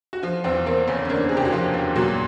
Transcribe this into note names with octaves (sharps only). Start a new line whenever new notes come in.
F#4
F3 F4
E2 C4
A#3 C4
E2 C#3 C#4
C#4
D3 A#3 D4
C3 G#4
G4
F#4
F3 F4
E2
A#2 F#3 F#4